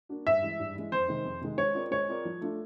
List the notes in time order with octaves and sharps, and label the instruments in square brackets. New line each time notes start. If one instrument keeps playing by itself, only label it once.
[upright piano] A#3 D4 F#4
[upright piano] G2 [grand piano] E5
[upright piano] E3 G#3
G2
E3 G#3
[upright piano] F2 [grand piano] C5
[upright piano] C3 D#3 G#3
F2
C3 D#3 G#3
[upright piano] G#3 [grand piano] C#5
[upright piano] C4 F4 A#4 D5
[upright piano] G#3 [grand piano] C#5
[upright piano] C4 F4 A#4 D5
F3
A3 D4 F4